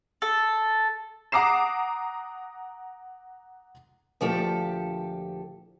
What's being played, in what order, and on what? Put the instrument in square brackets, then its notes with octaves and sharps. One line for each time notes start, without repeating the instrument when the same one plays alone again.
[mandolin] A4
[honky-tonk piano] F#5 A#5 D6 D#6 C7 E7
[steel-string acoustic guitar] D2 A#2 F3 G4 A4 G5